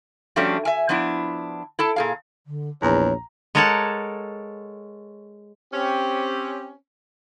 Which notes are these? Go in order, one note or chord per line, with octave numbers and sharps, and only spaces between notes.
F3 G3 A3 C#4 D4 F#4
E5 G#5
F3 B3 D4 E4
E4 A4 A5
A#2 G#4 F5
D3
A#1 E2 C#5 A#5
G#3 A4 A#4 C#5 F#5 A5
C4 C#4 G4